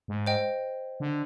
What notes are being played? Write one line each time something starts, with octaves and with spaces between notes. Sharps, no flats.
G#2
C5 D#5 G5
D3